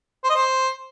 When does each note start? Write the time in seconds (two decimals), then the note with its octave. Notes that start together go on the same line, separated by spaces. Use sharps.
0.24 C5
0.29 D#5
0.35 C5